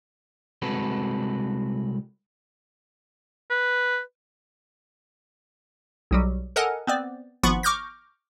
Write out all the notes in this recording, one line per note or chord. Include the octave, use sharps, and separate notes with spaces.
C2 G#3 C4 F#4 A4 B4
B4
B1 F#3 G3
A4 A#4 D#5 F#5 G#5
B3 C4 D5
G#1 F3 B3 F#5 B5 C#6
C#6 D6 F6 G6 A#6